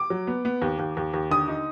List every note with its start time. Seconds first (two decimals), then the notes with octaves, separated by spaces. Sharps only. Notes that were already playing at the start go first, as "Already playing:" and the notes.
Already playing: D6
0.10 F#3
0.27 B3
0.45 B3
0.62 D#2
0.79 D#2
0.97 D#2
1.14 D#2
1.30 D3 D#6
1.48 D#4